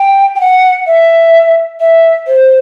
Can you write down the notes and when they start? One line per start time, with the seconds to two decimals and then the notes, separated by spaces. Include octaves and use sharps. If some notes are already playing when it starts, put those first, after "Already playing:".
Already playing: G5
0.35 G5
0.41 F#5
0.87 E5
1.80 E5
2.27 C5